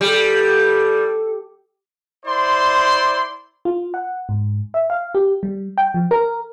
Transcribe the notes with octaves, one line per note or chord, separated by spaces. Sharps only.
G3 A4
E4 C5 D5 C6
F4
F#5
G#2
E5
F5
G4
G3
G5
F3
A#4